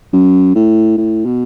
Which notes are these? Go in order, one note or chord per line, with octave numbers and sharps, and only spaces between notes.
F#2
A2
A2
B2